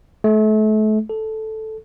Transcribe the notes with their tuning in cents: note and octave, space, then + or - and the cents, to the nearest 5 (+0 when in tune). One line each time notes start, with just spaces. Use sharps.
A3 -35
A4 -5